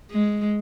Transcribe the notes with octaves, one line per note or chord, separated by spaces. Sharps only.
G#3